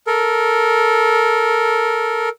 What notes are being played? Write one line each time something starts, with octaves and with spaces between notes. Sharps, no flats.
A4 A#4